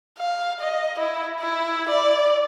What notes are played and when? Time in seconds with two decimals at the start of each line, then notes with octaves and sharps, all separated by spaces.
0.18 F5
0.60 D#5
0.99 E4
1.39 E4
1.89 D5